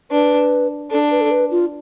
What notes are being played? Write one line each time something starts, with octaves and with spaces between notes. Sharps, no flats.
D4 B4
D4 A4
B4
A4
B4
F4